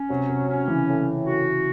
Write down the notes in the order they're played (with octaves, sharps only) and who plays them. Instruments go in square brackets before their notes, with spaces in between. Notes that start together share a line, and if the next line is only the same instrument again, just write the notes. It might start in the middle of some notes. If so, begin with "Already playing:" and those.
Already playing: [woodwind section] C#4
[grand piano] C3 [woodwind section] F#3
[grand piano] C3
[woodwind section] C#4
[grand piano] C#3 E3
[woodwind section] A2
F#4